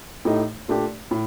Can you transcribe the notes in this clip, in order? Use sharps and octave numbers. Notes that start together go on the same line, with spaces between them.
A2 A3 D#4 G4
A#2 A3 D4 G4
A2